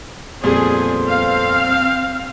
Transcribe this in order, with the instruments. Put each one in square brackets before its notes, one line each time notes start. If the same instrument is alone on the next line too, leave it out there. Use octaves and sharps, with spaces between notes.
[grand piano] F2 A#2 G3 [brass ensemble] B3 A4 C5 [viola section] G#4
[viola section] C4 F5